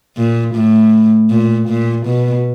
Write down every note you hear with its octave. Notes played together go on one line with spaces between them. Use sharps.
A#2
A2
A#2
A#2
B2